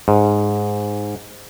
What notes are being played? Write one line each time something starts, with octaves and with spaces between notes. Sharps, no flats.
G#2